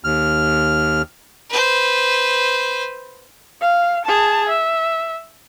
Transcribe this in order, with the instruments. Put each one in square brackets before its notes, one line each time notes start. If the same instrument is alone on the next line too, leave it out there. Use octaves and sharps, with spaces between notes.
[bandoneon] D#2 F6
[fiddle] B4 C5
[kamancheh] F5
G#4 A5
E5